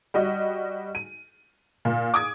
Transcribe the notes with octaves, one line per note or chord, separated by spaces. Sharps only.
G3 F#4 D#5
D#7
A#2
D6 D#6 G#6